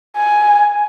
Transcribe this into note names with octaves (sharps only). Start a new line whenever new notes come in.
G#5